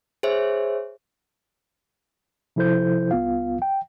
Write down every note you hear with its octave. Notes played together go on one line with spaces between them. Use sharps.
G#4 C5 C#5 E5
C3 F3 E4 A4 C5 G6
C2 B3 F4 F5
G5